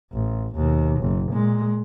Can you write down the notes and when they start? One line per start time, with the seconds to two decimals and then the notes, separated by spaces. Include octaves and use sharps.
0.13 A1
0.56 D#2 B2
1.01 F#1
1.33 A#2 G#3